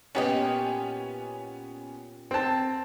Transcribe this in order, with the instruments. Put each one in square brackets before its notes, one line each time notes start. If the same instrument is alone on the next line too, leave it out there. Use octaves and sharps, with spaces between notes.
[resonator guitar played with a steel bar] A#2 G4 D#5 [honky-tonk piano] B3 C#4
[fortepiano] C4 A5